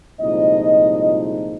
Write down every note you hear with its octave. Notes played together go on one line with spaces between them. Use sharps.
C2 A#2 F3 G#3 D#4 D#5